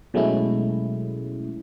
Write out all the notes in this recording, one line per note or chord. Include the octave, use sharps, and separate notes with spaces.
B2 F#3 G#3 A3 C#4 E4